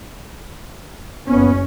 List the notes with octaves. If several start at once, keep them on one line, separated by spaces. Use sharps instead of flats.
F#1 B3 C#4